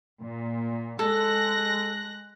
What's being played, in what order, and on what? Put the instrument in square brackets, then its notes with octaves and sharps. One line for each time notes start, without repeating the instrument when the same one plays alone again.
[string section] A#2
[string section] G#3 F#6 A#6 [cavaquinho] A4